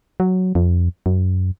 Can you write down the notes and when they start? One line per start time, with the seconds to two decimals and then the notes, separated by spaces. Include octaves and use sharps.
0.20 F#3
0.55 F2
1.06 F#2